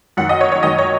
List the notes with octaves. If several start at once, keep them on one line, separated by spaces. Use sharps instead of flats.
F#2 D#3 F#5
D#5
C#5
C#5
F#2 D#3 D#5
C#5